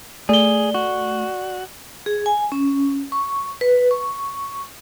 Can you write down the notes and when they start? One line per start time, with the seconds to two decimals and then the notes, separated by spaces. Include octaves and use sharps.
0.29 A3 G#4 D5 G7
0.74 F#4
2.06 G#4
2.26 G#5
2.52 C#4
3.12 C#6
3.61 B4
3.91 C#6